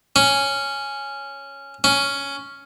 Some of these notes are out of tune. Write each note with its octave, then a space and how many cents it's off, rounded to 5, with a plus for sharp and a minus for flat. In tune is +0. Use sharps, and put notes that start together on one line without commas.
C#4 +0
C#4 +5